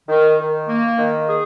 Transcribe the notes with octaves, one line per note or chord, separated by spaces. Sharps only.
D#3
D#3
A#3
D#3
G#4